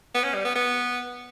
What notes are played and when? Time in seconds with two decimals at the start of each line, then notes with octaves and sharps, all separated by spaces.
0.15 B3
0.24 C#4
0.34 G3
0.45 B3
0.56 B3